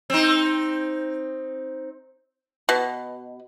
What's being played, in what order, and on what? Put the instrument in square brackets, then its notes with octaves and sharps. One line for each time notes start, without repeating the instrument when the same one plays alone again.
[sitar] C4 D#4
[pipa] B2